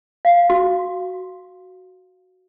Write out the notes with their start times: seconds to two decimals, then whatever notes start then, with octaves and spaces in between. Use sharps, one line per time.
0.25 F5
0.50 F#4